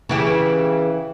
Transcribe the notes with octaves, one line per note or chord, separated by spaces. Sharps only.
C#3 E3 G4